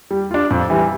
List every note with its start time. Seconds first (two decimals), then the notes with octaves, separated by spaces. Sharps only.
0.11 G3
0.31 D4 F4
0.51 F2
0.70 E3 G3